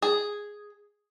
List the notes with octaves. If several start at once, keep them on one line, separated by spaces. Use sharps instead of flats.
G#4